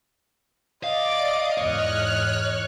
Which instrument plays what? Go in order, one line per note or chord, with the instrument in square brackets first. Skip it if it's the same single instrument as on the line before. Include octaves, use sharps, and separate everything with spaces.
[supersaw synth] D5 D7 [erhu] D#5 [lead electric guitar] F5
[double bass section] E2 G#2 [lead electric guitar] C#5 [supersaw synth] F6 F#6